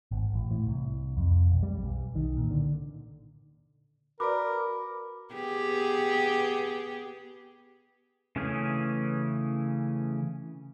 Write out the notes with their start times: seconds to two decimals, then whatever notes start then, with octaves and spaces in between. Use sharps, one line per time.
0.11 G#1
0.34 A1
0.51 A2
0.67 C2
1.17 F2
1.50 B1
1.63 G3
1.82 B1
2.15 D#3
2.37 A#2
2.51 D3
4.20 F#4 A#4 B4 D5 B5 D6
5.34 B3 G4 G#4
8.36 C#3 E3 A3 C#4 G#4